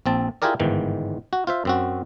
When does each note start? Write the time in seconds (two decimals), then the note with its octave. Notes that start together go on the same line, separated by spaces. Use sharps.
0.06 A#1 C4 A5
0.42 E4 F4 G4 G#4 A#4 D5
0.60 G1 G#2 D#3 E3
1.33 F#4
1.47 F4 C5 E5
1.65 F#2 C4 F#4